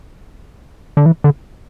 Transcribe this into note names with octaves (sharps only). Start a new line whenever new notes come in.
D3
E3
D3